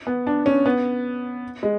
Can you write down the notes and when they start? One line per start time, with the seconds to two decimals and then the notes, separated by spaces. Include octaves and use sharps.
0.07 B3
0.27 D4
0.46 C#4
0.66 B3
1.63 G#3